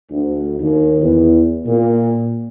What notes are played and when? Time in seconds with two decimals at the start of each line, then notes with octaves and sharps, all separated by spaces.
0.11 D2
0.60 D#2
1.02 E2
1.66 A#2